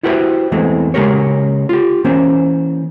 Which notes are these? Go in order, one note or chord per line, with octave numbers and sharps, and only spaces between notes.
E4 F#4 G4 B4 C5 E5
E2 E3 G#3 A3 C4
C#3 G#3 A#3 G4 A#4 C#5
F4 G4
E3 A#3 C#4 C5